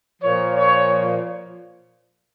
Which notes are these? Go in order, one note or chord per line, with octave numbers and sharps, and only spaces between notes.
A#2 F3 C#5
C#5